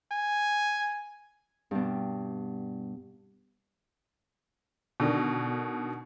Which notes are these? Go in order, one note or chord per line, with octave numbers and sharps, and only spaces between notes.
G#5
G2 B2
B2 D3 D#3